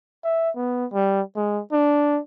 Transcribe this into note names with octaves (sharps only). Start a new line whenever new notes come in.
E5
B3
G3
G#3
D4